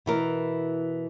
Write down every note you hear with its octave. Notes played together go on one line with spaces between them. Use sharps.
B2 E3 A#4